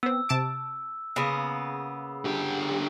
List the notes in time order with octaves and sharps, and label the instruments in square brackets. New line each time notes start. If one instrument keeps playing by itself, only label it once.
[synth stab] B3 C4 [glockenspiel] E6
[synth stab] C3 A5 D6
[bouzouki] C#3 A#3 B3
[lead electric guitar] D3 G4